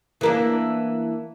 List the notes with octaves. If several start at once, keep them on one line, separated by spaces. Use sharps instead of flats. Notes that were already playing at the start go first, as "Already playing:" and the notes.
E3 A#3 D4